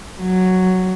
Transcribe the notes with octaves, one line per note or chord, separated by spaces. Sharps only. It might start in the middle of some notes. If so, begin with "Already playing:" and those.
F#3